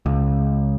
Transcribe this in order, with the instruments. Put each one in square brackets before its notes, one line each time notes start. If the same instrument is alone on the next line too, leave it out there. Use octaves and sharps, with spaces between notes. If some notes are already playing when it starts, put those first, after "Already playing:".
[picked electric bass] C#2